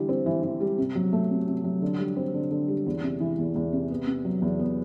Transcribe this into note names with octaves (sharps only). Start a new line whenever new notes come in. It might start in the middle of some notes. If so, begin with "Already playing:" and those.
Already playing: D3 E3 G3
C4
E3
E3
G3
C3
F#3
A3
C3
C3
F#3
D3
G3
C4
D3
D3
G3
E2
C3
E3
E2
E2
C3
B3
C3
F#3
E2
B3